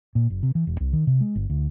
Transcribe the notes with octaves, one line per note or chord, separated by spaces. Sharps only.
A#2
F#1
C3
E3
E1
C2
D#3
C3
G#3
G1
D2